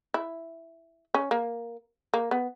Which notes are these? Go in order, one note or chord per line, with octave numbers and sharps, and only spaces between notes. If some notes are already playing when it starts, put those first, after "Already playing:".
E4
C#4
A#3
A#3
B3